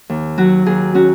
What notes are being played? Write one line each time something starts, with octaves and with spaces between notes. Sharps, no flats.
D#2
F#3 F#4
D#2 G#4
C#4 F#4